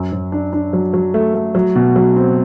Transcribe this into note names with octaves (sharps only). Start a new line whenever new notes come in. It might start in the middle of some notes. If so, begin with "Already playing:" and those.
Already playing: F#2
F#2
D4
D4
F#3
F#3
A3
A3
F#3
B2
F#3
C4